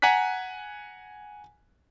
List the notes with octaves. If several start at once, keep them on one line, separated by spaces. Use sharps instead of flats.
F#5 G#5 A#5 F#6 B6